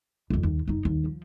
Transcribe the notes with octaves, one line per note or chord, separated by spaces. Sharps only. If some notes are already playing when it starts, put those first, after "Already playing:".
C2 F2
D#2
F#1 D#4
D#2
F3